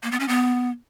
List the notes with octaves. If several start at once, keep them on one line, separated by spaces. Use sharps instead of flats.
A#3
B3
C#4
B3